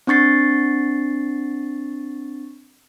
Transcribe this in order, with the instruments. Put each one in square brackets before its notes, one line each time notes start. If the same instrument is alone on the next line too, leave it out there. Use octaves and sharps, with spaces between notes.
[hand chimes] C4 D4 C#6 A6 C7